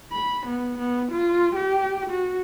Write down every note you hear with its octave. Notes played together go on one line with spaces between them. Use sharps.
B5
B3
B3
F4
G4
F#4